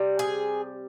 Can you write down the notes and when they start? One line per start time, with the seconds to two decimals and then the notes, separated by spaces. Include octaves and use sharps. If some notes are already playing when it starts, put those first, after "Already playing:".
Already playing: C3 G3
0.19 G#4